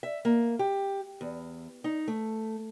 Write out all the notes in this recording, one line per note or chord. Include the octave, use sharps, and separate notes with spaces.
E5
A#3
G4
E2
D#4
A3